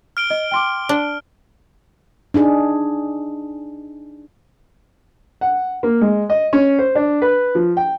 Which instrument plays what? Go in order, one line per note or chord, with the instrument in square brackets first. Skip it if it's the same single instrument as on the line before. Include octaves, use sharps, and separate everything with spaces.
[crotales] F6 D7 G7
[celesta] D#5
G5 C6 D6
[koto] D4
[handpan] D4 D#4 G#4
[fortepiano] F#5
A#3
G#3
D#5
C#4
C5
D4
B4
F3
G5